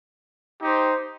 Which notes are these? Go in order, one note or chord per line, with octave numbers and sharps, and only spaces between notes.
D#4 G4 C5